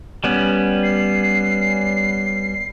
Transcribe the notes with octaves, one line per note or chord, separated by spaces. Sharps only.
G3 B3 C#4
C7